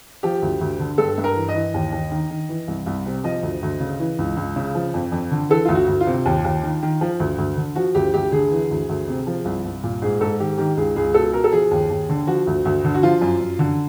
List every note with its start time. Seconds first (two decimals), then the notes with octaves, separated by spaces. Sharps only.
0.23 F3 G4
0.42 D2
0.61 D2
0.80 D3
0.98 G2 A4
1.18 G2
1.24 A#4
1.36 E3
1.48 D#5
1.55 E3
1.74 D#2
1.92 D#2
2.11 D#3
2.30 D#3
2.49 E3
2.68 C2
2.86 C2
3.06 C3
3.24 F3 D#5
3.43 D2
3.63 D2
3.80 C#3
3.99 E3
4.18 C#2
4.37 C#2
4.56 C#3
4.75 F3
4.94 F2
5.12 F2
5.31 D3
5.50 E3 A4
5.65 D2 F4
5.75 F#4
5.88 D2
6.00 F4
6.07 C3
6.26 D#2
6.44 D#2
6.63 D#3
6.82 D#3
7.01 F3
7.20 D2
7.38 D2
7.57 D3
7.75 F3 F#4
7.95 D2 G4
8.14 D2 G4
8.32 D3 G#4
8.52 E3
8.71 D2
8.89 D2
9.08 C3
9.27 F3
9.45 C2
9.65 C2
9.83 A#2
10.02 G#2 G#4
10.20 G#2 A4
10.39 D#3 G4
10.58 D#3 G4
10.77 C#2 G#4
10.96 C#2 G#4
11.14 B2 A4
11.33 B2 A#4
11.44 A4
11.52 F3 G#4
11.71 D#2
11.90 D#2
12.09 D3
12.27 F3 F#4
12.47 D2
12.65 D2
12.84 D3
12.95 F#4
13.03 F3 F4
13.21 F#2
13.40 F#2
13.59 D3